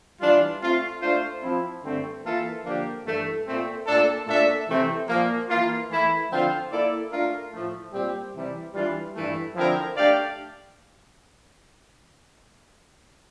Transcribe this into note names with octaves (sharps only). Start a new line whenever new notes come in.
E3 G3 D4 F4
A3 C4 F4
A3 D4 F4 C5
F3 C4 E4
G2 D3 A3 C4
E3 A#3 F4 A4 E5
D3 F3 A#3 D4 G4
G2 E3 A3
A#2 A3 C4
A#2 A3 D4 A4
A#2 A3 D4 A4 E5
C3 E3 A3 C4
A#2 F3 A#3
E3 A#3 F4
E3 A3 E4
D3 F3 C4 F4 C5
A#3 E4 A4 D5
A3 D4 F4 A#4
A2 F3 A3
A#2 G3 C4 G4
C3 E3 G3
E3 G3 D4 F4
G2 E3 A3
D3 F3 C4 E4 A#4
A3 D4 G4 D5 F5